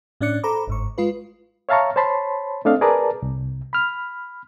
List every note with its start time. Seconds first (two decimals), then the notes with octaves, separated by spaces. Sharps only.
0.21 A2 C#4 D4 D5 F#6 C#7
0.43 A4 C5 A#5 B5 D6
0.67 G1 G#2 C#6
0.98 G#3 F4 B4
1.69 C#5 E5 F5 A5 A#5 C#6
1.96 C5 C#5 A5 B5 C6
2.65 A3 C4 D4 A4 D#5 F5
2.81 G#4 A#4 B4 D5 A5 A#5
3.22 C2
3.73 B5 F6